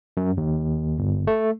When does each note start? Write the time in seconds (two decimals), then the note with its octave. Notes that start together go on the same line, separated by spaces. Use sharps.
0.17 F#2
0.37 D#2
0.99 G1
1.27 A3